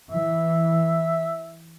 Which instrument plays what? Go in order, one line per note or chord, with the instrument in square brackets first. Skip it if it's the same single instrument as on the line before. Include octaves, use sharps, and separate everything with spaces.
[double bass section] E3 [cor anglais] E5